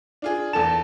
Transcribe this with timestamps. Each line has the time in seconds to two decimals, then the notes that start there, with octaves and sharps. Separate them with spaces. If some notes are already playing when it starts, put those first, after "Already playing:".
0.22 D4 F4 G#4
0.53 E2 A4 A5 E7